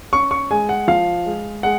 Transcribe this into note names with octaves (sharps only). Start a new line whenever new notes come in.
C#4 C#6
C#6
G#3 G#5
F#5
F3 F5
G#3
G#3 F#5